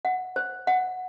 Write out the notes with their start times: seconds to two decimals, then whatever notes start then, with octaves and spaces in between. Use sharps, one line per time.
0.05 F#5
0.36 C5
0.67 F#5